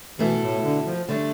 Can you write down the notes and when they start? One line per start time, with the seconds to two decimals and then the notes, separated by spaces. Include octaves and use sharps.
0.19 B2 E3 A3 E4 A4
0.41 A2
0.63 D3
0.86 F3
1.08 D3 G3 A3 D4